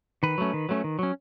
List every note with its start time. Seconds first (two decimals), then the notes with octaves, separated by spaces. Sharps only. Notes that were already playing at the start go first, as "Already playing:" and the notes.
0.23 D#3 B4
0.38 F#3 A3 C#4
0.53 D#3
0.69 F#3 A3 C#4
0.84 D#3
0.99 F#3 C#4